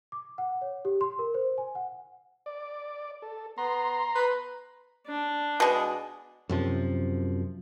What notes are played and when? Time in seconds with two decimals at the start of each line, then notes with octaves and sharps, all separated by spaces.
0.12 D6
0.38 F#5
0.62 C#5
0.85 G4
1.01 C6
1.19 A#4
1.34 C5
1.58 G#5
1.75 F#5
2.46 D5
3.22 A4
3.58 B3 A#5 C6
4.15 B4
5.07 D4
5.60 B2 G#3
6.49 F#2 C3 F3